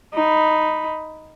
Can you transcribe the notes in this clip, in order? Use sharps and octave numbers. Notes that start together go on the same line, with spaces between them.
D#4 B5